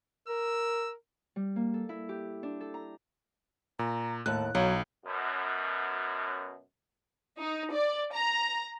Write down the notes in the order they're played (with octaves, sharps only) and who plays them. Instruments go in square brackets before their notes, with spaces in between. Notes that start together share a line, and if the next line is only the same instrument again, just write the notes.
[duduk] A#4 [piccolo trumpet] E6
[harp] G3
A#3
A4
E4
G4
D4
A4
A#5
[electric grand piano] A#2 [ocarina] A#5
[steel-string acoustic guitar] D#2 A2 [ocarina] A5 [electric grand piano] F#6
[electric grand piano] B1 [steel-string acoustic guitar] F#3 [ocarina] F5
[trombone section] F#2 B2
[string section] D#4
D5
A#5